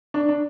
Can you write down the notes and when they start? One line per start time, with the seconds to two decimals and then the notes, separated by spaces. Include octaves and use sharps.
0.14 D4
0.29 D4